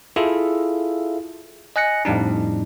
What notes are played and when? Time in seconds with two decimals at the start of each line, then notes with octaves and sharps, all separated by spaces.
0.16 E4 F4 G#4 A4 E5 F5
1.76 D#5 G#5 F#6 A#6 C#7
2.05 F2 A2 G3 D4 D#4